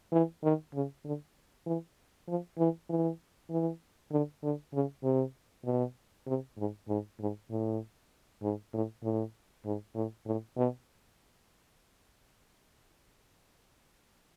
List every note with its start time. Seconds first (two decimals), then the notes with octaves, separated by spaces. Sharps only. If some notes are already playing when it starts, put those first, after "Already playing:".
0.12 E3
0.44 D#3
0.74 C#3
1.05 D3
1.66 E3
2.28 F3
2.58 E3
2.89 E3
3.50 E3
4.11 D3
4.43 D3
4.74 C#3
5.04 C3
5.65 B2
6.27 C3
6.58 G#2
6.88 G#2
7.20 G#2
7.50 A2
8.43 G#2
8.74 A2
9.03 A2
9.65 G#2
9.95 A2
10.26 A2
10.57 B2